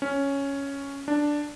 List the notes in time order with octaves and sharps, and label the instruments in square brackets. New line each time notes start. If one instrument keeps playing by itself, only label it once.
[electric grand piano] C#4
D4